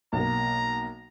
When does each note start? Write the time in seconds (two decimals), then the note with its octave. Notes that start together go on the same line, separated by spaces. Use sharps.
0.13 B1 A#3 A#5